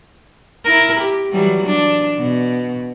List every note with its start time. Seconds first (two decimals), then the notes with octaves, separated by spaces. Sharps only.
0.64 E4 A#4
1.00 G4
1.32 E3 F#3 G3
1.66 D4
2.18 B2